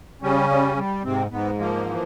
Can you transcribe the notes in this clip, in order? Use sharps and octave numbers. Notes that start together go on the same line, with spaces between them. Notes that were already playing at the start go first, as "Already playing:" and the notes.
C#3 G3 C#4
G3
G3
G#2 C3 C4
G#2 B3
F3 A#3
E3